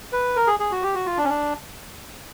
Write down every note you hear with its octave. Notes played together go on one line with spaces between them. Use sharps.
B4
A#4
G#4
G#4
F#4
G4
F#4
F4
D4
C#4
D4